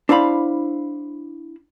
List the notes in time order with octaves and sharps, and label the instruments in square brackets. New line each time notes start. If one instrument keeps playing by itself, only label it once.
[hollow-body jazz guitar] D4 E4 C5 F5 B5